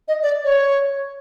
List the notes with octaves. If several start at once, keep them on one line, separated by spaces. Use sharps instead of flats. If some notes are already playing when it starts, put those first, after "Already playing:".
D#5
D5
C#5